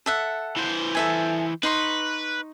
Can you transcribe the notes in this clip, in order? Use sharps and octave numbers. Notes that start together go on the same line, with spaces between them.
A4 E5 F#5
E3 C5
A4 E5 G#5
D#4 B4 C6 C#6